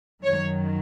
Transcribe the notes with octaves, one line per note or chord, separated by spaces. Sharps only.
F#2 D#3 F#3 C#5